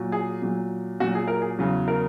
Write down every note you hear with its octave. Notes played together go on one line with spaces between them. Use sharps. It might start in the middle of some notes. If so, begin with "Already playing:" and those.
Already playing: A#2 F#3
G#4
A#2 F#3
A#2 F#3 F#4
G#4
A#4
G#4
E2 C#3 F#3
A#4